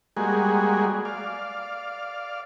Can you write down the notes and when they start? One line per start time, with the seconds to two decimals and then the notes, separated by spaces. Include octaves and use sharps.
0.17 G3 G#3 A#3 F#4 G#4
1.05 D5 F5